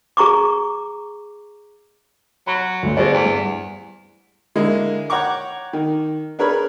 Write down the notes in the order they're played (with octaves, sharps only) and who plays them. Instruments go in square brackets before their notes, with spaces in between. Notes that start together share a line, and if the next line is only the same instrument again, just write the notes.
[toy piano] G#4 A#5 C#6 D6
[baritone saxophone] F#3 [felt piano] B5
[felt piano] D2 G2
[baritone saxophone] B2 [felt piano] G#4 C5 D5
[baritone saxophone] E2
[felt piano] G2
[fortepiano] D3 G#3 A#3 E4
C#5 F#5 G5 A#5 C#6 D6
D#3
D4 G#4 A#4 B4 C#5 B5